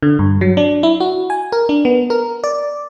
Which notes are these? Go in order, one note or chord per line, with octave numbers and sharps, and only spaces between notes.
D3
G2
F#3
D4
E4
F#4
G#5
A#4
D4
B3
A#4
D5